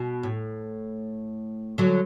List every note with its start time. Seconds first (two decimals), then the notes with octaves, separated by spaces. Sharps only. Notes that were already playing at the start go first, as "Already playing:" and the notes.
Already playing: B2
0.23 A2
1.78 D3 F#3